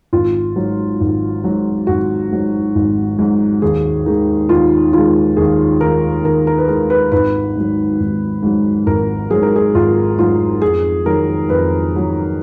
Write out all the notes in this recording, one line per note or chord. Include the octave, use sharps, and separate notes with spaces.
G#1 F4
G#2 F#3
G#1
G#2 F#3
G#1 F#4
G#2 F#3
G#1
G#2 F#3
D#2 G#4
D#3 G#3 D#4
D#2 F4
D#3 G#3 F4
D#2 G#4
D#3 G#3 A#4
D#2 A#4
A#4
B4
D#3 G#3 A#4
B4
G#1 B4
G#2 F#3
G#1
G#2 F#3
G#1 A#4
G#2 F#3 G#4
A#4
G#4
G#1 F4
G#2 F#3 F4
F2 G#4
D#3 F#3 A#4
F2 B4
D#3 F#3